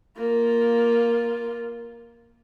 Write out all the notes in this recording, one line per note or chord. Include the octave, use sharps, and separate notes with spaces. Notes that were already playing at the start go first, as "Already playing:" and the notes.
A#3 F4